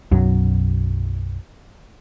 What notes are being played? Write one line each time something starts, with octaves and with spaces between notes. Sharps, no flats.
B1 F#2 F#3